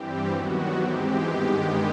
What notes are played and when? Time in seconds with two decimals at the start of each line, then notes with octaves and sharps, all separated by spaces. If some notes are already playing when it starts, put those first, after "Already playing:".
Already playing: G2 E3 G3 C4 G4
0.28 D#2 D#3 F#3 B3 F#4
0.76 G#2 E3 G#3 C4 G4
1.23 G2 D#3 G#3 B3